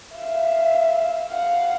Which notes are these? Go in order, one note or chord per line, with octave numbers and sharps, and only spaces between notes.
E5 F5
F5 F#5